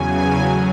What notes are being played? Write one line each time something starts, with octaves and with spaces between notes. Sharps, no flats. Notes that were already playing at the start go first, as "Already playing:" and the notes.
Already playing: E2 C#3 F#3 G#5
A2 F#3